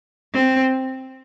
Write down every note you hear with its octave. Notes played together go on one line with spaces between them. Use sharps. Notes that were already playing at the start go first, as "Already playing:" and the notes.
C4